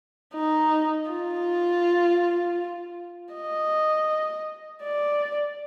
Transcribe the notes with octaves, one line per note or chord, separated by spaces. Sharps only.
D#4
F4
D#5
D5